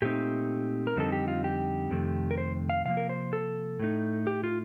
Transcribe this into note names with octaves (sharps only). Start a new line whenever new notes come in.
A#2 A3 C4 D#4 G4
A#4
F2 D3 G3 C4 D#4 A4
G4
F4
G4
F2 C3 D#3 A3
A#4
C5
F5
C3 F3 A#3 F5
A#4
C5
A4
A2 A3 D#4
G4
F4